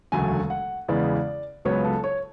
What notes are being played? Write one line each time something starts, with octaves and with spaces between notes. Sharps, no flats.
E1 D2 C#3 F#3 A3 G#5
F#5
E2 C#3 G#3 B3 D5
C#2 C#3 F#3 B3 C#5
A4
C#5